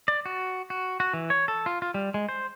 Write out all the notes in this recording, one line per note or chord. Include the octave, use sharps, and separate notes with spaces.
D5
F#4
F#4
F#4
E3
C#5
A4
F4
F4
G3
G#3
C5